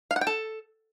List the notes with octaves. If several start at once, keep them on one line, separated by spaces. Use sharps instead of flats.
F5
F#5
G5
A4